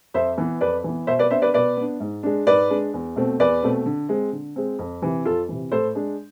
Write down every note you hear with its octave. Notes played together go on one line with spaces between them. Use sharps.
F2 C5 E5
E3 B3
F2 B4 D5
E3 B3
B2 C5 E5
B4 D5
B3 D4 C5 E5
B4 D5
B2 B4 D5
B3 D4
G#2
G#3 D4
G#2 B4 D5
G#3 D4
E2
B2 A3 C4
E2 B4 D5
B2 A3 C4
D3
G#3 C4
D3
G#3 C4
F2
C3 E3
F2 F4 A4
C3 E3
A2 A4 C5
G#3 D4